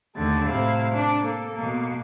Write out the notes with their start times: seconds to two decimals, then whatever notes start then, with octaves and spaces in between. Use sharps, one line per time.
0.15 D#2 D3 A3 A6
0.45 A2 C3 E4 F5
0.91 D4
1.20 A#3 A4
1.53 B2 A#3